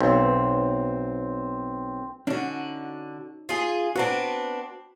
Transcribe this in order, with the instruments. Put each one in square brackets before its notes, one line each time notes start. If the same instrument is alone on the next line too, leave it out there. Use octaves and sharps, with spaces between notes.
[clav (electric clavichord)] B1 [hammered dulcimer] C4
[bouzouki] D3 F#4 [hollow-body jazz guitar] C#4 D#4
[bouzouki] F4 G#4
[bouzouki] B3 C4 D4 [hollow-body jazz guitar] F#4 A#5